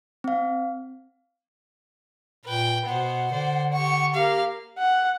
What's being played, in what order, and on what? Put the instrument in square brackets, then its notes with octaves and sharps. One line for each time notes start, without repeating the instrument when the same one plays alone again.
[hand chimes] C4 F5
[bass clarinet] A#2 [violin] B4 G5
[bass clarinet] B2 [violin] B3 C5 [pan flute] F#5
[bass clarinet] D3 [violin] C5 D5
[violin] G4 C#6
[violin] A#3 F5 [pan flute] G4
[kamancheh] F#5